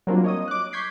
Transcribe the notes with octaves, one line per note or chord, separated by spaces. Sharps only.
F#3 G3 A#3 C4 D4 F4
C#5 D#5 D#6
D6 F#6
C#6 D6 G6 G#6 B6 C7